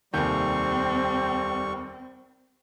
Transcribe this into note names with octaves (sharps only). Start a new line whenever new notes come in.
F1 D#2 G3 C4 C#6 G6